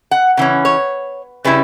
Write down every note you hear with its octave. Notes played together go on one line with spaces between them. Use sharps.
F#5
C#3 E3 C#4
C#5
C#3 G3 C#4 E4 B4